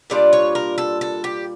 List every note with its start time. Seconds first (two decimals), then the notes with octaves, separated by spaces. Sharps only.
0.10 A#2 G3 D4 F4 D5
0.33 C#5
0.55 A#4
0.78 A4
1.01 A4
1.24 G4